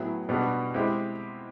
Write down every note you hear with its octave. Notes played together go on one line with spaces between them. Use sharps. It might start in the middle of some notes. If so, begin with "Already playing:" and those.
Already playing: A2 F#3 B3 E4 G#4
B2 G3 B3 D4 F#4
G#3 C4 E4 G4